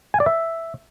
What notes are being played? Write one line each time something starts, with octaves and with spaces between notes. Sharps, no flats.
G#5
D5
E5